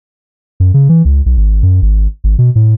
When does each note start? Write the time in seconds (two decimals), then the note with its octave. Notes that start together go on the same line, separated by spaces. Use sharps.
0.60 F#2
0.74 C#3
0.89 E3
1.05 C#2
1.26 B1
1.37 G#1
1.63 F#2
1.82 G#1
2.24 G#1
2.39 B2
2.55 A2